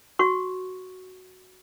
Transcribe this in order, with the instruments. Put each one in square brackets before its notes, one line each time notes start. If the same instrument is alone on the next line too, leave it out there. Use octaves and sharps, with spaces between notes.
[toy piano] F#4 C#6